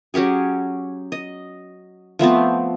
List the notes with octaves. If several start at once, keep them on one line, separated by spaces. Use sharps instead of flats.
F#3 C#4 G4 G#4
D#5
F3 A3 B3 C4